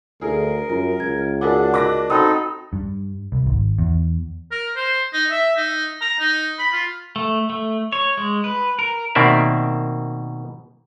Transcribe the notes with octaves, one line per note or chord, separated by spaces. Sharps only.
D2 G#4 A#4
F#2 F4
C#2 G#6
D4 F#4 G#4 A#4 D5 F#5 D6
F#4 A#4 D#5 D6 F#6 A#6
C4 D#4 F#4 A4 B5 D#6
G2
C2
G#1
E2
A#4
C5
D#4
E5
D#4
A#5
D#4
B5
F4
A3
A3
C#5
G#3
B4
A#4
B2 D#3 A#3 C4 D5 E5